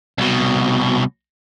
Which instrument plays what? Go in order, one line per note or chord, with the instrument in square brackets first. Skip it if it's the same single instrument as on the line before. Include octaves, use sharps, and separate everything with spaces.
[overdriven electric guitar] C2 B2